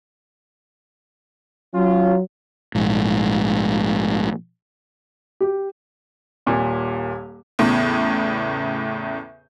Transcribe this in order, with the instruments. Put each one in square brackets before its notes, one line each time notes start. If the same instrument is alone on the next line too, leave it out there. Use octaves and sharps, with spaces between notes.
[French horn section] F#3 [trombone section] C#4 F4
[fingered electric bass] A#1 G#2
[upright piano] G4
[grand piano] D#1 A#2
[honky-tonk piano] E2 A2 C#3